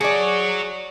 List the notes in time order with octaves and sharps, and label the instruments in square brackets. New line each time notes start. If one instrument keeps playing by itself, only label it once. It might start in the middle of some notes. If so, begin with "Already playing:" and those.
[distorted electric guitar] F#4 C#5 [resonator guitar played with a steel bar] G#4 D5